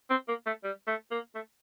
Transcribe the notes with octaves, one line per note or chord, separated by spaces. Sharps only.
C4
A#3
A3
G3
A3
A#3
A3